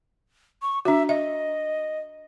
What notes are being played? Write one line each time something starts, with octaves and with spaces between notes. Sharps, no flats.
C#6
D4 F#4 E5
D#5 E5